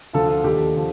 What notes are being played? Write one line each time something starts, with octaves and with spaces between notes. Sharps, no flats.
D2 D3 F3 F4 A4
F4
D#2 D3 F3 G4
D3 F3